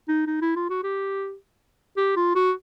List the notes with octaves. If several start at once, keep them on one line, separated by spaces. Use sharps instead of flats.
D#4
D#4
E4
F4
F#4
G4
G4
F4
F#4